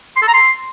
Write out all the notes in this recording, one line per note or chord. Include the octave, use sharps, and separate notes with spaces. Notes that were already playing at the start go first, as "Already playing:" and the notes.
C6
A4
A#5
C6